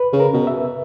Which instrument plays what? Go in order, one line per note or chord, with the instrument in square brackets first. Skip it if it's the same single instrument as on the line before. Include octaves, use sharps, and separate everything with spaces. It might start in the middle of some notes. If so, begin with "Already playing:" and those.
Already playing: [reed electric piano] B4
[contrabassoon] C#3
[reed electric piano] A#4
[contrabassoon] B2
[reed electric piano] E5